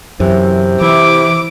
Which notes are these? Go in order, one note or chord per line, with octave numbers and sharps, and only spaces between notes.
F#2 C3 E3
E3 E4 D6